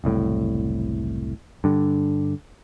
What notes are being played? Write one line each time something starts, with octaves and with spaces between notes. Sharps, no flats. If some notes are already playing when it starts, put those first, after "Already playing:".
F#1 C2 A2
G2 D3